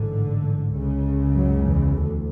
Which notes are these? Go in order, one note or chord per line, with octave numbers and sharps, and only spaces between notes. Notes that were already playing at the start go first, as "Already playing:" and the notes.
Already playing: A1 G#2 D3
C#2 C#3
F#2 F#3
E2 E3
D2 D3